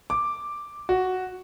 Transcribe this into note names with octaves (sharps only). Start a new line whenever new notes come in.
D6
F#4